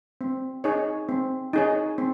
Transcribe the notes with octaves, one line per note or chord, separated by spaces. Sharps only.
C4
D#4 G#4 C#5
C4
D#4 G#4 C#5
C4